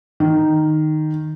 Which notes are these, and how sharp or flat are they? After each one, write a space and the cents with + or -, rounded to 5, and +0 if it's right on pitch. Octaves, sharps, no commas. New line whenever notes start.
D#3 -10